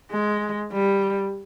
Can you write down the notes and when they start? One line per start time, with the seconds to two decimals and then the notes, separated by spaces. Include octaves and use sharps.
0.11 G#3
0.73 G3